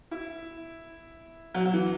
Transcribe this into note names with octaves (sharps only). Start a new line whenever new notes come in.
E4
F#3
F#3
E3